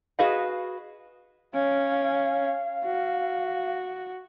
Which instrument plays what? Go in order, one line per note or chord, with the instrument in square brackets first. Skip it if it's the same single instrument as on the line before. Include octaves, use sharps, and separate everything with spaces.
[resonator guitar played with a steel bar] F#4 G#4 B4 D#5 F5
[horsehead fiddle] C#4 [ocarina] F5
[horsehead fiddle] F#4